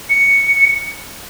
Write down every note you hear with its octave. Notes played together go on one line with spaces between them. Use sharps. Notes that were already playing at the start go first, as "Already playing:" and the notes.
C#7